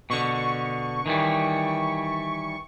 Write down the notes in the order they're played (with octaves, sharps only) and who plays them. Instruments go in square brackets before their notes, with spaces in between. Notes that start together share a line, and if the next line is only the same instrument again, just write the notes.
[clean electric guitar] B2 D3 [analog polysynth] C#6
[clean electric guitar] D#3 E3 G3